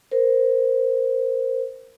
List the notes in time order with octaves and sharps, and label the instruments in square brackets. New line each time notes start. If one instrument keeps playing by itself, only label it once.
[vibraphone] A#4 C5